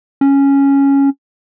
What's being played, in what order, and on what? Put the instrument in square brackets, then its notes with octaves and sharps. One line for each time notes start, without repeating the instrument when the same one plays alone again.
[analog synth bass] C#4